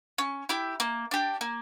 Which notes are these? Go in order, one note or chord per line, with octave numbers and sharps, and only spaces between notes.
C#4
E4 G4
A#3
D4 G4
A#3